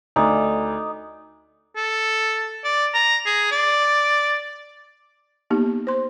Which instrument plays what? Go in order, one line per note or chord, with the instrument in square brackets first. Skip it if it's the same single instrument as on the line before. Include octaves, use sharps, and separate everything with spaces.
[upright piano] D2 [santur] D#4 D5
[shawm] A4
D5
A#5
G#4
D5
[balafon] A#3 B3 D#4 G4
C5 C6